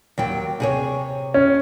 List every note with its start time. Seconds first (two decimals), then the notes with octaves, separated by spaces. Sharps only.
0.18 D#2 F#3 G5
0.60 C3 G#4 C#5
1.34 C#4